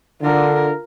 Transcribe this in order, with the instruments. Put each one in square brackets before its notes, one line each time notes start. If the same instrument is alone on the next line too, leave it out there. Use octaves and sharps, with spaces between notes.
[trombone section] D3 [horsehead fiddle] F4 A#4